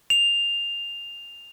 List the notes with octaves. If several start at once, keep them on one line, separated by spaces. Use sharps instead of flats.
F7